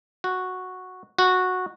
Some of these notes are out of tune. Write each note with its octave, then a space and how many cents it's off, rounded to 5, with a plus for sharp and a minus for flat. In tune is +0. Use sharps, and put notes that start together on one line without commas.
F#4 -5
F#4 -10